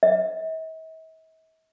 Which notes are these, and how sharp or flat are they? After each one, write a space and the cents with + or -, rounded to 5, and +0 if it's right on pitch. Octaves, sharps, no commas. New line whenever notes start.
E5 -45